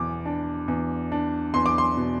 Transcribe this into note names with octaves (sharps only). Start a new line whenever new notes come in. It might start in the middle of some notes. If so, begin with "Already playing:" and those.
Already playing: E2 B2 B3 D6
D4
E2
D4
E2 C6
D6
C6
B2